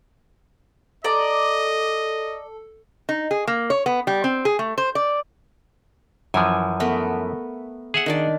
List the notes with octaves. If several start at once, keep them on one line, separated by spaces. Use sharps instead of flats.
A4 D5 D#5 A#5
D#4
G#4
A#3
C#5
B3
G3
C4
G#4
A3
C5
D5
F#2 E3 F3 G#5
A3 B3 A#4
G#4 E5 F#5
D#3 D4 D5